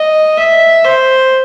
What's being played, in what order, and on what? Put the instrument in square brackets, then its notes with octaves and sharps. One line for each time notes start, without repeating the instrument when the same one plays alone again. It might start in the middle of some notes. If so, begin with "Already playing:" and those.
Already playing: [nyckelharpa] D#5
E5
C5